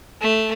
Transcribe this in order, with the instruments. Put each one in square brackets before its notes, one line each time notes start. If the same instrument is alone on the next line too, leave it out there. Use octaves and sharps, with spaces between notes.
[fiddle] A3